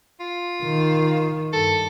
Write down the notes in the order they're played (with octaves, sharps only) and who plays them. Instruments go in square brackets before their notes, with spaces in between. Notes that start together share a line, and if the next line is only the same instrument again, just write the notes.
[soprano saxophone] F4
[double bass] D#3
[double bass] G2 [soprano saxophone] A4